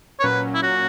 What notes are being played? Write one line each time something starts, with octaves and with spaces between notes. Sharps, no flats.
C#5
A#2 F#3 C#4 B4
E4
F#4